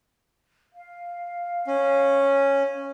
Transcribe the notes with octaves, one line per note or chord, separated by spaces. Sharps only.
F5
C#4